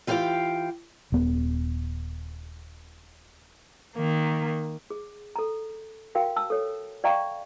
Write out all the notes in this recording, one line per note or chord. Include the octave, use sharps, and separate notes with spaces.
E3 F4 G4 A#4 F5 G5
D#1 B3
D#3 A#3
G#4
A4 A#5
F#4 A#4 F5 G5
A5 E6
A4 C#5
D5 E5 F5 G5 A#5 C#6